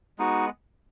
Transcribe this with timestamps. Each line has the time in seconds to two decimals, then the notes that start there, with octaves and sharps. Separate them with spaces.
0.18 G#3 B3 D#4 F#4